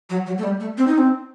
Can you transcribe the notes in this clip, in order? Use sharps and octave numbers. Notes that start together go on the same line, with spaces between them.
F#3
F#3
A3
G3
A3
C4
D#4
C4